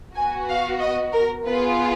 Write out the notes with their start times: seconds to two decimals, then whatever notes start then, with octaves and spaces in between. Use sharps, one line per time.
0.15 B3 F#4 G#5
0.48 F5
0.80 D#5
1.13 A#4
1.46 B3 F4 G#4 B4